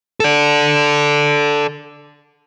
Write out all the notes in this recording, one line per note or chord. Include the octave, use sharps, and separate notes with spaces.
A4 D5